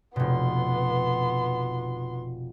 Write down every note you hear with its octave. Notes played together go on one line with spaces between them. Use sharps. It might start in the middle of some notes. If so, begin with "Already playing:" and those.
F1 B2 B3 C6